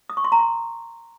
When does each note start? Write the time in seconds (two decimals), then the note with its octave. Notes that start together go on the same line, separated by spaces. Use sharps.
0.10 D#6
0.17 C#6
0.24 C6
0.32 A#5
0.39 C6